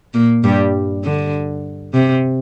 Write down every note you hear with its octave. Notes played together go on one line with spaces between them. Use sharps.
A#2 A#3
G2 G3
D3
C3